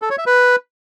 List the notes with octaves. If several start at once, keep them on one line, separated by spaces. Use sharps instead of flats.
A4
C#5
E5
B4